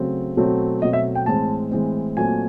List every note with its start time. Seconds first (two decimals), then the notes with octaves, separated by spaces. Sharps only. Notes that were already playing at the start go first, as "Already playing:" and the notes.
Already playing: C#3 F#3 A3 C4
0.37 B2 F#3 A3 C4
0.82 B2 F#3 A3 C4 D#5
0.93 E5
1.15 G5
1.26 A2 E3 G#3 C4 A5
1.71 A2 E3 G#3 C4
2.17 A#2 F#3 A3 C4 G#5